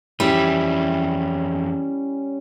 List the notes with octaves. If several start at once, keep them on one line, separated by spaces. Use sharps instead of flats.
F2 E3 G3 C#4 E4